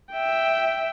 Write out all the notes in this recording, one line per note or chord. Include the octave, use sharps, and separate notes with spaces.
E5 G5